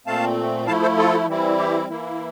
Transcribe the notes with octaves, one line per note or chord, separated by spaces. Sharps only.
A#2 A3 C4 F5 A5
F3 A3 E4 F5 A5
A4 C5
F4 A4
E3 G3 C4 E4
G4
E3 A#3 E4